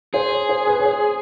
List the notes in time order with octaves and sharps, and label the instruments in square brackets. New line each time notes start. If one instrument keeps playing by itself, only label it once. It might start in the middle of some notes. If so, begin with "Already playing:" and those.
[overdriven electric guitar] G#4 [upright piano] C5
[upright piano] C#5
C5
B4
C#5
C5